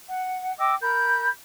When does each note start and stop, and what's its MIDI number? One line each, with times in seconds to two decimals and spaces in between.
0.06 0.52 78
0.58 0.73 75
0.58 0.73 79
0.58 0.73 86
0.58 0.73 88
0.80 1.27 70
0.80 1.27 83
0.80 1.27 91